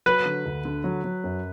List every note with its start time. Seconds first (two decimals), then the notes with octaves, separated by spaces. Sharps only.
0.06 F#3 B4
0.25 D3
0.46 D2
0.65 D3
0.84 F#3
1.04 F#3
1.24 F#2